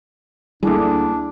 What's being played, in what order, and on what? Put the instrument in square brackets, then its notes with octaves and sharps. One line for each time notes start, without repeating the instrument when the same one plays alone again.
[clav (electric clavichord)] D2 D3 [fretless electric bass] G3 A#3 [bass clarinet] D4 [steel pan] E4 G#4